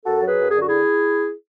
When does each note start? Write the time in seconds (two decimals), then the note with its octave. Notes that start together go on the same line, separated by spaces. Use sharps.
0.05 F#2 F#4 A4
0.21 F#3
0.27 G#4 B4
0.38 F#2
0.50 G#4
0.56 D3 F#4
0.67 E4 G#4